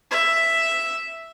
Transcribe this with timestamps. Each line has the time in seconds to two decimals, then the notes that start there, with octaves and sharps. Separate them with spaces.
0.11 E5